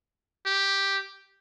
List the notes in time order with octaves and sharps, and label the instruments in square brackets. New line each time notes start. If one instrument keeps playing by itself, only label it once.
[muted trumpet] G4